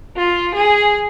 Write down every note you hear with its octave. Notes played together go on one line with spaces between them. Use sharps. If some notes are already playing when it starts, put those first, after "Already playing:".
F4
G#4